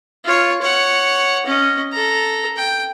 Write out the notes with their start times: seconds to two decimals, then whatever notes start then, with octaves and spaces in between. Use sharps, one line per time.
0.24 F4 C#5
0.61 C#5 F#5
1.46 C#4 D#5
1.92 A4 A#5
2.56 G5